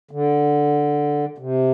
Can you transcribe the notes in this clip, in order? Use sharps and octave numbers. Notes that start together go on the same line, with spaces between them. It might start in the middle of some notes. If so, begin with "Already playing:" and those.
D3
C3